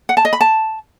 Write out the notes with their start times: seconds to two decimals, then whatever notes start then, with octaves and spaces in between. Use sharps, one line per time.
0.09 F#5
0.17 A5
0.25 D#5
0.33 B5
0.41 A5